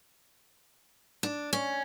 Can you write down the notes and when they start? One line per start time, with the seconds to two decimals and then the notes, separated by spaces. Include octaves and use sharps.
1.23 D4
1.53 C#4